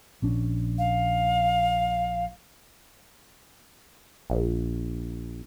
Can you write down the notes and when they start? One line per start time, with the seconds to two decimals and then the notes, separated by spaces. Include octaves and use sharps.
0.22 A#1 C#4 D4
0.78 F5
4.30 A#1